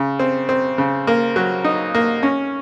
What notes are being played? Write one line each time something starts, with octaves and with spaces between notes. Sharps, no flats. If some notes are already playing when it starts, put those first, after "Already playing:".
Already playing: C#3
C4
C4
C#3
A#3
F#3
D#4
A#3
C#4